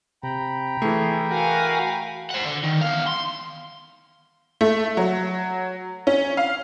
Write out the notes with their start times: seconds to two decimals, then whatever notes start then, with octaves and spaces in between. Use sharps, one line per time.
0.23 C3 G5 A#5 B5
0.82 E3 A3 G#4
1.31 F#4 A#4 F5 F#5 G#5
2.31 C5 F#5
2.45 D3
2.64 D#3
2.82 E2 F5
3.07 C6
4.61 A3
4.97 F#3
6.07 C#4
6.37 F5